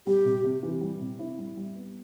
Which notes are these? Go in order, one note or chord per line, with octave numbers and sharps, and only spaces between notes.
G3 G4
C3
C3
E3
G3
C3
E4
G3
G3
B3